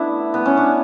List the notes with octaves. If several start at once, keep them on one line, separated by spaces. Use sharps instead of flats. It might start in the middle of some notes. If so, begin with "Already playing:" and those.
Already playing: A3 B3 D4 E4
B3
C#4
D4